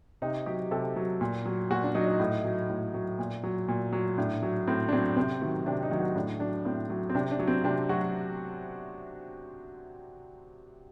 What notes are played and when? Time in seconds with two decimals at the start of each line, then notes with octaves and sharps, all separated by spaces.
0.22 C3 D#4
0.46 F#3 G4
0.71 C3 A4
0.96 F#3
1.21 A#2
1.46 F#3
1.70 A#2 F#4
1.83 D4
1.95 F#3 D#4
2.08 D#4
2.20 A2
2.44 F#3
2.70 A2
2.94 F#3
3.19 A#2
3.44 F#3
3.68 A#2
3.93 F#3
4.18 A2 D4
4.43 F#3
4.67 A2 C4
4.88 D4
4.92 F#3 C4
5.17 C3 C4
5.41 D#3 F#3
5.66 C3 D4
5.83 D#4
5.91 D#3 F#3
5.99 F#4
6.15 A2 D4
6.40 F#3 D4
6.65 A2 C4
6.90 F#3
7.10 C4
7.15 C3 D4
7.31 D4
7.39 F#3
7.47 C4
7.64 C3 D4
7.89 F#3 F#4